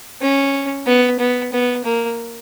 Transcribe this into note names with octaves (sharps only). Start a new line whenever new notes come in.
C#4
B3
B3
B3
A#3